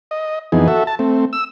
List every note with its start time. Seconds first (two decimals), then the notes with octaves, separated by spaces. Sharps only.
0.11 D#5
0.52 F2 E3 B3 D#4 G#4
0.68 F#4 A4 E5
0.87 A5
0.99 A3 C4
1.33 E6